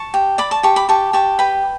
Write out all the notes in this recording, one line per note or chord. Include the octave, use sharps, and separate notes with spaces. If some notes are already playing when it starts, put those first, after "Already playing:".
Already playing: A5 C#6
G4
D5 B5 D6
A5 C#6
G4 A5 C#6
B5 D6
G4 A5 C#6
G4 A5 C#6
B4 G5 B5